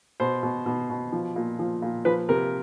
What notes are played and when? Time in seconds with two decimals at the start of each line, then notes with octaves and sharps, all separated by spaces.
0.20 B2 C5
0.43 B2
0.66 B2
0.90 B2
1.12 F3
1.36 A#2
1.59 F3
1.82 A#2
2.05 F3 B4
2.29 C3 A#4